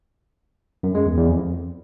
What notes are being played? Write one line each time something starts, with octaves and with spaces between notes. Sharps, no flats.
F#2
G#3
E2
E2
F2